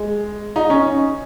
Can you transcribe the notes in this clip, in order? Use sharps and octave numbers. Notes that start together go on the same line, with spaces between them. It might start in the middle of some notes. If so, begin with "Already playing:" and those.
Already playing: G#3
D#4
C#4